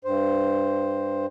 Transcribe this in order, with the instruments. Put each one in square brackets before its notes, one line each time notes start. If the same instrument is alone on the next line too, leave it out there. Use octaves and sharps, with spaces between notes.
[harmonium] G2 C5